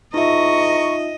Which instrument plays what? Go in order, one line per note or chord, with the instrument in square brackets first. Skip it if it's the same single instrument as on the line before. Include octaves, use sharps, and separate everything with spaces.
[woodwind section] E2 A#5 C#6 [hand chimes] D#4 F4 E5 [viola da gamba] D#5